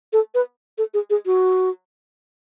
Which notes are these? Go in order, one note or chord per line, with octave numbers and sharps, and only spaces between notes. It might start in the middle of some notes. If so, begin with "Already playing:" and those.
A4
B4
A4
G#4
G#4
F#4